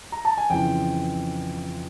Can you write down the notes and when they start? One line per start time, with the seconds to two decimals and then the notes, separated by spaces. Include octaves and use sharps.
0.12 A#5
0.25 A5
0.37 G#5
0.50 F2 C#3 E3 G5